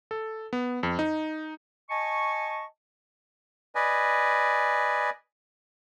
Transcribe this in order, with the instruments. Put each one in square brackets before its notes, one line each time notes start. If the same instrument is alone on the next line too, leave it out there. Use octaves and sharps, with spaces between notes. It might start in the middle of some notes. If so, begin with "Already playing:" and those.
[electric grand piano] A4
B3
F2
D#4
[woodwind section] D#5 G#5 A5 C#6
[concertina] B4 D5 D#5 G#5